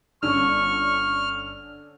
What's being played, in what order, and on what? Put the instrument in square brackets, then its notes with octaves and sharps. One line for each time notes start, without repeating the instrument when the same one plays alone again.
[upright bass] G1 [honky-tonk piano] D3 C#4 [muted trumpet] C#6 [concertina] F6